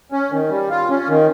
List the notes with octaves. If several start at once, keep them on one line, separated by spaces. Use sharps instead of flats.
C#4
D#3
G3
F4
C#4
D#3